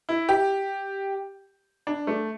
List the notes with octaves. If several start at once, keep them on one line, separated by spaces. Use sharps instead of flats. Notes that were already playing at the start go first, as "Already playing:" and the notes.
E4
G4
D4
A3